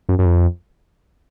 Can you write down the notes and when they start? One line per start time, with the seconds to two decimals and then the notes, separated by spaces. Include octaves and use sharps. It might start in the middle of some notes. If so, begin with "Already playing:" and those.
0.09 F#2
0.19 F#2
0.26 F2